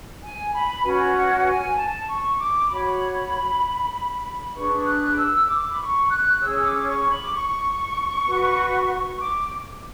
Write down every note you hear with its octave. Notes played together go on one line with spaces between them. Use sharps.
G#5
B5
C#4 F#4 B4 G#5
F#5
G#5
A5
C#6
D6
F#4 C#5 B5
D4 G#4 B4 C#6
F#6
D6
E6
D6
B5
C#6
F#6
C#4 G#4 C#5 E6
D6
C#6
B5
D6
C#6
F#4 B4
D6